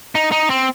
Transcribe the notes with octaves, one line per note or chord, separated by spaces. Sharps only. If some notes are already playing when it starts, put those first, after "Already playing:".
D#4
D#4
C4